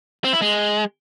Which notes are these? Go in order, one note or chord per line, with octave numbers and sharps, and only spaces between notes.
C4
E4
G#3